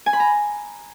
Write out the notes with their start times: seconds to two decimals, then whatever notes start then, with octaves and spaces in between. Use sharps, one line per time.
0.06 G#5
0.13 B5
0.20 A#5